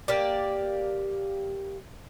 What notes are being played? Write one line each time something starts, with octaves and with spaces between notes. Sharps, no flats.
A#3 G4 D5